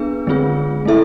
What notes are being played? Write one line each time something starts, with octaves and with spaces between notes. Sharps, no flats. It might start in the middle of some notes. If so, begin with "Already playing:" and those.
Already playing: B3 D4 G#4 B4
D3 G#3 C4 F4 G#4
A3 E4 A4 E5